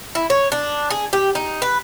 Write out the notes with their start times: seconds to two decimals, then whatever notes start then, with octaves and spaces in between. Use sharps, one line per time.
0.15 E4
0.30 C#5
0.52 D4
0.90 G#4
1.13 G4
1.35 D#4
1.62 B4